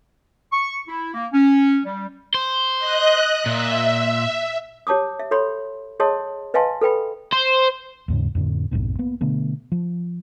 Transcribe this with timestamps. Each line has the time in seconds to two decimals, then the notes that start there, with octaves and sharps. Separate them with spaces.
0.52 C#6
0.88 E4
1.14 A#3
1.33 C#4
1.85 G3
2.34 C5
2.79 D#5 F#6
3.46 A#2 E5
4.87 G4 C#5 A5 D6 D#6
5.19 E5
5.31 A4 C#5 B5 C6
6.00 G#4 C#5 D#5 A5 C6 D#6
6.54 B4 D#5 F5 G#5 A5 C6
6.81 A4 B4 G5 B5
7.32 C5
8.08 D#2 G#2 C#3
8.35 F2 A2 D3
8.71 A#1 F2 G#2 B2
8.99 A#3 B3
9.21 B2 D3 A3 B3
9.72 F3